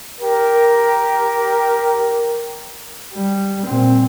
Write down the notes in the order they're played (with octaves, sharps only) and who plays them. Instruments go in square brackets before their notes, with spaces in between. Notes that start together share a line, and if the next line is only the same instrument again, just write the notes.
[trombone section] G4 A#4
[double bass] G3
A#2 C4